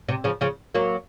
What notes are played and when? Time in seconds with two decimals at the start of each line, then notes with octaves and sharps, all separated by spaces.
0.09 C3
0.24 C#3 F3
0.41 C#3 F3
0.75 F#3 A#3